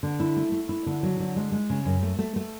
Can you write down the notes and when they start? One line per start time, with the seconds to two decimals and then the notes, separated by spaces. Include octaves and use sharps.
0.03 D3
0.20 E4
0.36 A3
0.52 A3
0.69 E4
0.86 D3
1.03 F#3
1.20 D3
1.36 G#3
1.52 G#3
1.70 C#3
1.85 F#2
2.03 A3
2.19 A3
2.36 A3